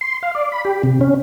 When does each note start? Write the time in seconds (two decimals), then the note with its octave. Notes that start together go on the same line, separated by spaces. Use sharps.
0.01 C6
0.23 F5
0.35 D5
0.52 B5
0.65 G4
0.83 C3
1.01 C#4